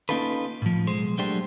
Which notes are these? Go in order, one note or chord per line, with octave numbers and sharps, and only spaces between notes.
A#3 C#4 D#4 F4 A4 B4
A2 F3
B1 G#3 C5
F#3 G#3 A3 D4 G4 C5